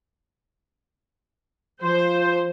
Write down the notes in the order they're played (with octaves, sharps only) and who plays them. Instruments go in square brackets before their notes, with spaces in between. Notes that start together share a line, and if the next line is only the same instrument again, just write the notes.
[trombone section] F3 [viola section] C5